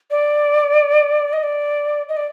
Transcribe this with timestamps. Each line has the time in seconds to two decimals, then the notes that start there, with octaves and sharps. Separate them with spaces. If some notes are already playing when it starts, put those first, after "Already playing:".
0.11 D5
1.33 D#5
1.43 D5
2.09 D#5
2.17 D5